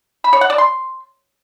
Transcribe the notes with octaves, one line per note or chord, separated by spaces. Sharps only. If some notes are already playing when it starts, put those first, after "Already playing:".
B5
C#5
F#5
D5
C6